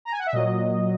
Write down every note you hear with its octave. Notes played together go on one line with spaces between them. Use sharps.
A#5
G#5
F#5
E5
A#2 F#3 D#5